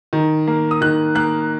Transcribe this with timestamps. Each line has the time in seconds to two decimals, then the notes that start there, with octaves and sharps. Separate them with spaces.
0.13 D#3
0.47 A#3
0.71 D#6
0.81 D#3 F#6
1.15 A#3 F#6